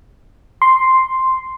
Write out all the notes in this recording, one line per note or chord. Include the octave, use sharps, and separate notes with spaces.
C6